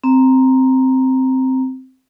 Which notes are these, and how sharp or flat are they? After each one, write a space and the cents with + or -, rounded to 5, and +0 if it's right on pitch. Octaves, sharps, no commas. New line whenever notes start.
C4 -5 A#5 +0